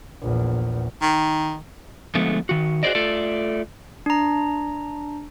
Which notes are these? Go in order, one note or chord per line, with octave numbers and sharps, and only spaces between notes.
A#1 E2
D#3
D3 F3 G#3 A3 B3
D#3 F#4
F#4 G#4 C5 D5 D#5
A3 F4 A4 D5
D4 A#5